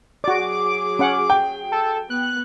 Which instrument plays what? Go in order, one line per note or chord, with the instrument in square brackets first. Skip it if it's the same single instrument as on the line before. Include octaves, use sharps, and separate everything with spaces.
[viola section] F#3 G#4 [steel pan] F#4 D5 [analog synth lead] D6
[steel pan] C#4 F#5
[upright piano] G5
[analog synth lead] A4
[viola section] B3 [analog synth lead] F#6